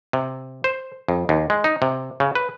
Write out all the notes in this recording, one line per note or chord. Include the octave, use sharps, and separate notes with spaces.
C3
C5
F2
D#2
G#3
D#4
C3
C#3
B4